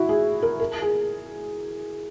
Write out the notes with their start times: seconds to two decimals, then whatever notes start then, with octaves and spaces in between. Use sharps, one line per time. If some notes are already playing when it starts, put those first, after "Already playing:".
Already playing: E4 F#4
0.09 G#4
0.43 A#4
0.60 A#4
0.82 G#4